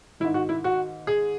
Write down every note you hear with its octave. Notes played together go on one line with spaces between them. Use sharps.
G#2 D#3 E4
F#4
E4
F#4
G#4